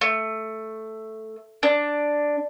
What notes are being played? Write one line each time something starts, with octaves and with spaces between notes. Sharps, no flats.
A3
D4